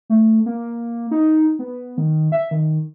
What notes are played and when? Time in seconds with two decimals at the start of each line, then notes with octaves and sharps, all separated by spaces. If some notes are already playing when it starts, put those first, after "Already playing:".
0.10 A3
0.46 A#3
1.11 D#4
1.59 B3
1.98 D#3
2.32 E5
2.51 D#3